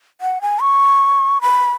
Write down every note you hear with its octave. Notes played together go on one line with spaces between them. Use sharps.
F#5
G#5
C#6
B5